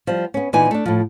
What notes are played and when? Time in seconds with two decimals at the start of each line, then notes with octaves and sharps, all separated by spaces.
0.07 F3 G3
0.34 B3 C#4
0.53 A#2 E3 B3 D#4 G#5
0.71 A3 D4
0.85 A2 F3